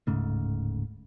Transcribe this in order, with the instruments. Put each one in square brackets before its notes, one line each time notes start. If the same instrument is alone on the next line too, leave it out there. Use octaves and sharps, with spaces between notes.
[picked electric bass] D1 G#2 C#3 A3